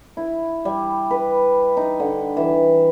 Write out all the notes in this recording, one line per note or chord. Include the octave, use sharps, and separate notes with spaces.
E4
G3
B4
D#4
D3
E3